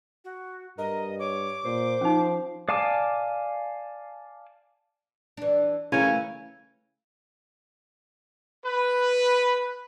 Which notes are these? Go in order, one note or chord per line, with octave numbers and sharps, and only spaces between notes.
F#4
G2 A#4 D#5
C#5 D6
A#2 C5
F3 C#4 D#4
D5 F5 G#5 A5 D6
E3 D4
C#3 E3 A3 C#4 A#4
B4